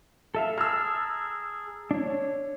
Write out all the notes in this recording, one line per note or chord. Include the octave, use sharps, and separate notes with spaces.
A4 E5 F5
G#4 A5 A#5 E6 F6
D4 C#5